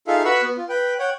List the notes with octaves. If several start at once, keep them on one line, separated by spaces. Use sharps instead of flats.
D#4 F4 G#4 A4 E5 F5
F#4 B4 F#5 B5 C#6 E6
B3
F4
B4 G5
C#5 F#5 G5